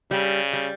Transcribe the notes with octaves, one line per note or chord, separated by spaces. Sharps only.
C#3 G3
G3